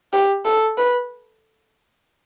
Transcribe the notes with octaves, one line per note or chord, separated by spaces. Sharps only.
G4
A4
B4